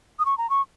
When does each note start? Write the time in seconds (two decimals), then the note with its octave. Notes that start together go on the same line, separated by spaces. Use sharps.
0.19 D#6
0.25 C#6
0.38 A#5
0.50 C#6